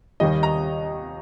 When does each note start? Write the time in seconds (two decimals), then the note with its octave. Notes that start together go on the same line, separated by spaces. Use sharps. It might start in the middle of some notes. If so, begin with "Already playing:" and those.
0.20 D#2 D#3 G3 D#5
0.43 A#5